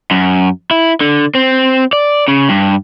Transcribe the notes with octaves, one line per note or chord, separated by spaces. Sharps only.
F#2
E4
D3
C4
D5
C#3
G2